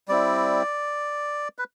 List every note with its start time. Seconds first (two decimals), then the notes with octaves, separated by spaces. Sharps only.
0.08 G3 C4 E4 D5
1.59 B4